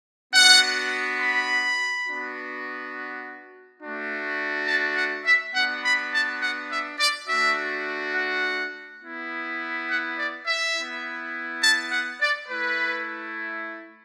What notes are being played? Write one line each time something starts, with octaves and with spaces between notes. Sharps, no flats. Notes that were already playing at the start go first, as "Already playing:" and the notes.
B3 D4 F#4 F#5
B5
B3 D4 F#4
A3 D4 F#4
A5
F#5
E5
B3 D4 F#4 F#5
B5
A5
F#5
E5
D5
A3 D4 F#4 E5
F#5
B3 E4
F#5
D5
E5
B3 E4
A5
F#5
D5
A3 E4 B4